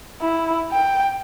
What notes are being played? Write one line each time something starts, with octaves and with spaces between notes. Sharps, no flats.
E4
G5